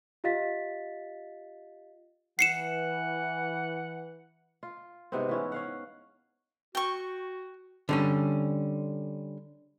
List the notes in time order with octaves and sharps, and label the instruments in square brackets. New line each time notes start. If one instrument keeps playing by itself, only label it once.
[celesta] F4 G4 D#5 F5 A6 B6
[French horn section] E3 [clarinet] F#5 [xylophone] C7 C#7 E7
[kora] F4
G#2 C3 B3 C4
E3 C#4 E4
C#4 F5 F#5
[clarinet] F#4 [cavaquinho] G5 C#6
[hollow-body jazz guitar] D3 G3 C#4